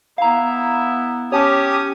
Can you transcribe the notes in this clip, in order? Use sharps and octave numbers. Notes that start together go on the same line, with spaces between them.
B3 E4 F5 A#5
C#4 G4 C#5 A5 D6 D#6